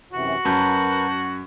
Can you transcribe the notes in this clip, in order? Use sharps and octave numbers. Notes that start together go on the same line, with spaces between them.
F#2 C3 E3 F#4
F#2 A#4 B4 A5 G6